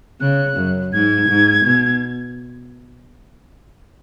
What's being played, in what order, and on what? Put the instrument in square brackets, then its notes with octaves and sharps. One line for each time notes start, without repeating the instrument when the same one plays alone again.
[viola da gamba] C#3 [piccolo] F#6
[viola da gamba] F#2
[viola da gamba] G#2 [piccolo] G#6
[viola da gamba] G#2
B2